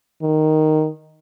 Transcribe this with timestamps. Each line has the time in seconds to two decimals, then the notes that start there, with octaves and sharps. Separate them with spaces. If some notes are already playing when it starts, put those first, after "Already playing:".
0.22 D#3